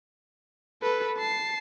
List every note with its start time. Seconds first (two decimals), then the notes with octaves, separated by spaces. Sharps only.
0.82 A4 B4
1.18 A5 C7